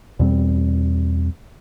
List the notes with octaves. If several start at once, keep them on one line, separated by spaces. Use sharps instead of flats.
E2 B2 G3 C4